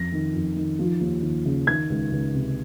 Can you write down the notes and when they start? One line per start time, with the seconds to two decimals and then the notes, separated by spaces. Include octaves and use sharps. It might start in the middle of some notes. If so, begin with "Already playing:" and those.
Already playing: F2 A#6
0.12 D#3
0.34 F2
0.56 D#3
0.79 F3
1.01 D#2
1.22 D#2
1.45 C#3
1.67 D#3 G#6
1.90 C#2
2.11 C#2
2.34 C3